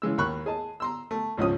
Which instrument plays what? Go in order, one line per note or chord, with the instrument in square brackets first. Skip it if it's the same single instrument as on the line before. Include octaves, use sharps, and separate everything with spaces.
[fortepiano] C#3 E3 G#3 E6
D#2 A#4 B5 C#6 F#6
G#4 D#5 A5
A#5 C6 E6
A3
G#1 C#2 F3 C#4 D#6